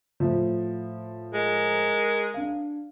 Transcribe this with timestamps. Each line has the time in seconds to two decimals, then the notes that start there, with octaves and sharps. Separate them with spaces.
0.20 A2 F3
1.34 G#3 A#4
2.34 D4 F5